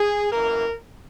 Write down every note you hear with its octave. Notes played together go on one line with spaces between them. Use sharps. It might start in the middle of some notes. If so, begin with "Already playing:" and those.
Already playing: G#4
F#2 E3 A#3 A#4